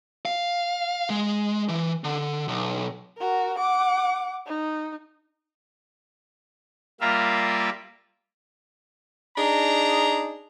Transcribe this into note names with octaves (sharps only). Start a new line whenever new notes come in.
F5
G#3
E3
D3
B1
F#4 A#4
F#5 D6
D#4
G3 A#3 F4 A#4 E5 F5
D4 D#4 G#4 A#5